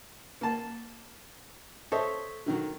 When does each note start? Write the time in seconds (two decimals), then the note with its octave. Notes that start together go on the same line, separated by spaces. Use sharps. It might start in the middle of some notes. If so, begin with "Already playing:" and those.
0.41 A#3 A5
1.92 A4 C5 C#5 D#5 E5
2.46 D3 D#3 F#3